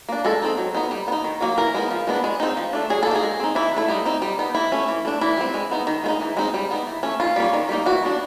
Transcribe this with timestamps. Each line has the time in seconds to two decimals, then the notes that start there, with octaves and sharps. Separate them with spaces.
0.09 A#3 D4
0.25 G#3 A4
0.42 C4 D#4
0.58 F#3
0.75 B3 D#4
0.91 G3
1.08 B3
1.12 D#4
1.24 D#3
1.41 F#3 A#3
1.57 E3 A#4
1.75 G#3 B3 D#4
1.91 F3
2.07 G#3 B3 D4
2.24 G#3
2.40 C4 D#4
2.57 F3
2.73 A3 D4
2.90 F#3 G#4
3.03 A#3 A4
3.11 D#4 G#4
3.23 G#3
3.40 C4 D#4
3.55 E3 E4
3.72 D4
3.76 A3 E4
3.88 G3 D#4
4.06 C4 D#4
4.22 G3
4.39 B3 D#4
4.55 E3 E4
4.72 A3 C#4
4.88 E3
5.05 A3 D4
5.21 E3 E4
5.37 G3 C4
5.54 G#3
5.71 B3 D#4
5.87 D#3
6.04 G#3 B3
6.08 D#4
6.21 E3
6.37 G#3 C4 D#4
6.54 G3
6.71 B3 D#4
6.87 E3
7.03 A3 C#4
7.20 D#3 F4
7.36 G3 A#3 C#4
7.53 D#3
7.69 G3 A#3 D#4
7.86 E3 F#4
8.03 G3 B3 D4